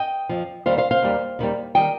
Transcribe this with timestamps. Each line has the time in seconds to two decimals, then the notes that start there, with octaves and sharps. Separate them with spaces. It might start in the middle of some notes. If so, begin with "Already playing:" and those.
Already playing: D#5 G5
0.29 F2 F3
0.66 D#2 D#3 G3 C5 F5
0.78 C5 F5
0.91 C5 F5
1.02 D#2 D#3 G3
1.39 D#2 D#3 G3
1.75 D#3 G3 D#5 G5